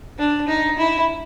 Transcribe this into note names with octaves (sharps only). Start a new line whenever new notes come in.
D4
D#4
E4